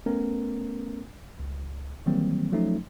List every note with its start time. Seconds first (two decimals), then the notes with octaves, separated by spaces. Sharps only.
0.06 A3 B3 C#4 A#4
1.39 C#2
2.06 D#3 E3 F#3 G3 A#3 C4
2.52 F3 F#3 A3 C#4 D#4